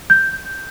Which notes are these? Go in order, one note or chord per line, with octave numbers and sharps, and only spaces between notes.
G6